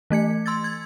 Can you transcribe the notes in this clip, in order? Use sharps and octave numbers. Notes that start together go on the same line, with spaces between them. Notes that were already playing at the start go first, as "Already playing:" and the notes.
E3 A3 G#6 C#7
C6 E6 G#6 A6
G#6